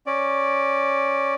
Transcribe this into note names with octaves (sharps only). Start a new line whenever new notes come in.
C#4 D5